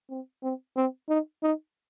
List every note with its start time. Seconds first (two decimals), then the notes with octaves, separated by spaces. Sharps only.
0.10 C4
0.43 C4
0.76 C4
1.09 D#4
1.43 D#4